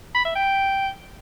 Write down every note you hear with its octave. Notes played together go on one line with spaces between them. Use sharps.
B5
E5
G5